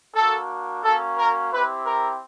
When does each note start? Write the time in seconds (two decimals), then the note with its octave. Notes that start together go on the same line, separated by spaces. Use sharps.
0.14 A#3 D4 F#4 A4
0.83 A#3 C#4 F#4 A4
1.18 A#4
1.52 C4 E4 G4 B4
1.86 A#4